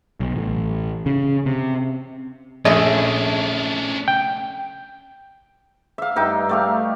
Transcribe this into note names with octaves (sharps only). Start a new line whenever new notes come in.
B1
A1
C#3
C3
A#1 A3 C#4 D4 G#4 C5
G5
E5 F5
G2 D#4 E5 G5
A3 G4 F5